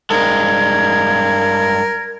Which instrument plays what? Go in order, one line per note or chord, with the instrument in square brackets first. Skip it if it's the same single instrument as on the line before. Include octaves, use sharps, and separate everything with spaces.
[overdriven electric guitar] G2 G#3 [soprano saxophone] A#4 [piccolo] G#6